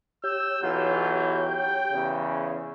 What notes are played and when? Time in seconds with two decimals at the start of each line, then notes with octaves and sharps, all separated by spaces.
0.24 G4 C#5 E6 G6
0.62 B1 E3 F#3 F4
1.42 G5
1.92 E2 C#3